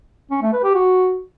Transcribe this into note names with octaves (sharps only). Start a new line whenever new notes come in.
C#4
A3
B4
G4
F#4